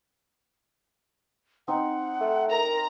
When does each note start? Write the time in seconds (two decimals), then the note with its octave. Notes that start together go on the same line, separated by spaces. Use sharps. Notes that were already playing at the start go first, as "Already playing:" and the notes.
1.68 C4 D#4 F#5
2.21 A3
2.50 A#4 A#5